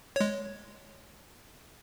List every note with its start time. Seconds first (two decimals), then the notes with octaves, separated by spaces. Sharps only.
0.16 G#3 C#5